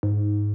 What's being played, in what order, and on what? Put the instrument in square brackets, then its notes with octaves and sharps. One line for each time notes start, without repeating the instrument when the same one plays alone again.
[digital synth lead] G#2